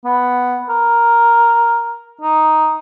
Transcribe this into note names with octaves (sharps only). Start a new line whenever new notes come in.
B3
A#4
D#4